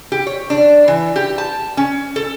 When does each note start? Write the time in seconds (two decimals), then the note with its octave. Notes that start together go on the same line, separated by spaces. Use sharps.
0.12 G4
0.27 C#5
0.50 D4
0.88 E3
1.16 G4
1.38 A5
1.77 C#4
2.16 A4